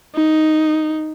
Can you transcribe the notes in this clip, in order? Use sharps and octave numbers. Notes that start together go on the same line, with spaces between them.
D#4